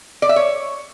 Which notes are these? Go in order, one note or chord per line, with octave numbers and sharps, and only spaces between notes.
D5
E5
C#5